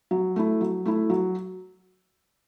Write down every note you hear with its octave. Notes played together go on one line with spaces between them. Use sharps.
F#3
A3 E4
F#3
A3 E4
F#3